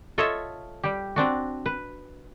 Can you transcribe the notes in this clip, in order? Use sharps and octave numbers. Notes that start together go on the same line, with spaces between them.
F4 A4 C#5 D#5 E5
G3 G4
C4 D4 F#4
B4